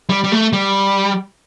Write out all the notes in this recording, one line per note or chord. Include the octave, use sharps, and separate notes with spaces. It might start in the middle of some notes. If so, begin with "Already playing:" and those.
G3
G3
A3
G3